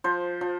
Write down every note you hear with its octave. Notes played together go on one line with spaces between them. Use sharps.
F3 C5
F3